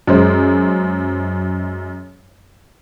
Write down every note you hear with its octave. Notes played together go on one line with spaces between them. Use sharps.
F#2 G#3 C5